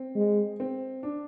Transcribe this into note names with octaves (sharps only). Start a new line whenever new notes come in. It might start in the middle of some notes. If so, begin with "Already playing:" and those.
Already playing: C4
G#3
C4
D4